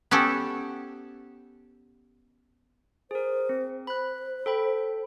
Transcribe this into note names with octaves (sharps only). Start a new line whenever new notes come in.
B3 C#4 G4 A4
G#4 A#4 C5
C4
C5 B5 F#6
A4 G5 B5